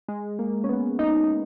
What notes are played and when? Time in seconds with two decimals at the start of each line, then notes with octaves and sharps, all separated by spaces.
0.08 G#3
0.39 A#3
0.64 C#4
0.69 B3
0.99 D#4